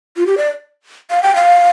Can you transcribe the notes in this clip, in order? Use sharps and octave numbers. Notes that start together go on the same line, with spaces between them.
F4
G4
D5
F5
G5
F5